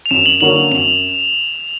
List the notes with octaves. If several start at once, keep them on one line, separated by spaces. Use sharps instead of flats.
F7
F#2 E7
F#7
D3 F#3 A#3 C#4 F#7
F#7
F#2 F7